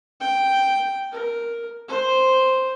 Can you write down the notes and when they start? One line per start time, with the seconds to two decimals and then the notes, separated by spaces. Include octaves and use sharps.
0.20 G5
1.12 A#4
1.88 C5